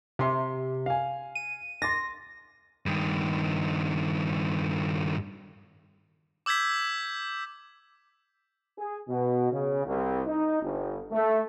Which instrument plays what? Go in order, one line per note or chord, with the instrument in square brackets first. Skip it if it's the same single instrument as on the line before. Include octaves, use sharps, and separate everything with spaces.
[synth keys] C3 [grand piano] E5 C6
[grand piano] F5 G#5
[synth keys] D#7
[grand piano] C6 D6 A6 [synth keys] A#6
[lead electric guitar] G2 D#3
[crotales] D6 E6 G6 G#6 B6
[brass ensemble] G#4
B2
C#3
C2
D#4
G1
A3